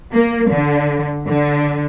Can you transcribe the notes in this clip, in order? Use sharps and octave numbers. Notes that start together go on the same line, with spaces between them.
A#3
D3
D3